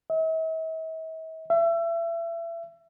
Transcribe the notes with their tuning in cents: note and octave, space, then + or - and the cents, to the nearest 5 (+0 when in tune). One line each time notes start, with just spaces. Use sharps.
E5 -45
E5 +30